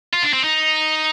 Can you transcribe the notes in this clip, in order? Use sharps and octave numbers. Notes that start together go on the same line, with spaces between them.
F4
D4
C4
D#4